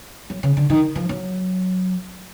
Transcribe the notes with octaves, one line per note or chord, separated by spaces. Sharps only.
F#3
C#3
D3
D#3
F3
F#3